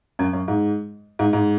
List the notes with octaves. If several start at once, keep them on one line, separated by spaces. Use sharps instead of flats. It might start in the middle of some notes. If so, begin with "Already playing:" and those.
F#2
F#2
G#2
G#2
G#2